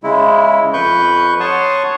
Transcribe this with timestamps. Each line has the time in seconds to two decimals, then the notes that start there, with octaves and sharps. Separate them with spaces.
0.03 C#3 G#3 E4
0.73 F2 B4 C#6 F#6 G6
1.40 C#5 F#5 A5 C6 C#6 D#6